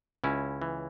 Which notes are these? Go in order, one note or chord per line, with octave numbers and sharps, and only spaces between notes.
C#2 C#4 E4
E3